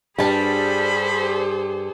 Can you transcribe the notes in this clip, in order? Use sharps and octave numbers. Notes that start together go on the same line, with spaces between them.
G2 G3 G#4 A4 C5 A5 B5